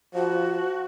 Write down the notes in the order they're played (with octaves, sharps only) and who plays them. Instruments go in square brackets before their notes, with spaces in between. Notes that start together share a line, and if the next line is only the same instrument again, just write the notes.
[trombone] F3 [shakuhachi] F#4